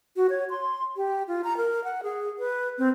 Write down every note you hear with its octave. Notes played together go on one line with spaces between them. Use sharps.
F#4
C#5
C6
G4
F4
A#5
A#4
F#5
G#4
B4
C4